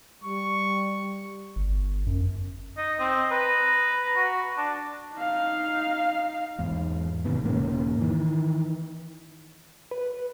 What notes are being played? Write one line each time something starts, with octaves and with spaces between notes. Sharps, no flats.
G3 C#6
G1
F#2
D#4 D#5
C4 D#5
B4 A#5
F#4
D4
D#4 F5
E2 G#2
G#2 C3 D#3 B3
E1 G#2 C#3 A#3
D#3 E3
B4